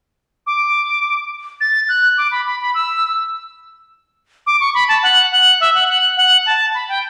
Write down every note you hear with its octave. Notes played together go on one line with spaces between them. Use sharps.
D6
A6
F#6
D6
B5
B5
B5
E6
D6
C#6
B5
A5
F#5
F#5
E5
F#5
F#5
F#5
A5
B5
G5